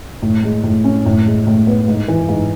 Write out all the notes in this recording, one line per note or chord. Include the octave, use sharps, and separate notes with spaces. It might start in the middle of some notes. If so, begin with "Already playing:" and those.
A2
G#3
A2
C#4
A2
G#3
A2
B3
G#2
E3
G#2